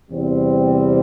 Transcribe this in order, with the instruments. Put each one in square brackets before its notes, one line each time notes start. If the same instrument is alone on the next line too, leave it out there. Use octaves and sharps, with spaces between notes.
[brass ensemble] E2 C3 G3 C4